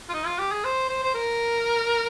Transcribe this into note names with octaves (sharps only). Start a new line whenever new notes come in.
F4
D#4
F4
G4
G#4
C5
C5
C5
A#4